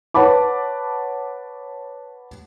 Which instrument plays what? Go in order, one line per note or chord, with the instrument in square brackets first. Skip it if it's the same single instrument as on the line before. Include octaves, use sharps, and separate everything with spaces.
[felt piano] B4 C#5 F#5 A5 B5 D6